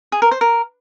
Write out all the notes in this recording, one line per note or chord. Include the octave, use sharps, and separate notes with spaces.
G#4
A#4
C5
A#4